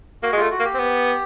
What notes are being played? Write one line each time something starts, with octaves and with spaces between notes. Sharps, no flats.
A#3 F#4
G#3
A3 F4
F#4
A#3
G4
C4
B3